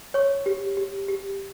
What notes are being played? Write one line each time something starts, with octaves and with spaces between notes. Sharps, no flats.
C#5 C#6
G4
G4
G4